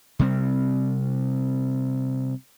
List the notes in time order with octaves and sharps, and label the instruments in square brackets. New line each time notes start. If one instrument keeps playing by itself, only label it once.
[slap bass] C3 G3 C4